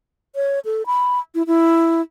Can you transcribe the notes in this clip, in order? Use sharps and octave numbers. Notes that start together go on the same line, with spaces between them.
C#5
A4
B5
E4
E4